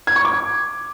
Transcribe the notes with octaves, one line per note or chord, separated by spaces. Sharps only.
G#6
C#6
D6